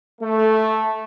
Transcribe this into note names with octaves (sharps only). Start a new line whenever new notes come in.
A3